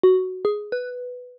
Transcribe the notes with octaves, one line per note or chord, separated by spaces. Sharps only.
F#4
G#4
B4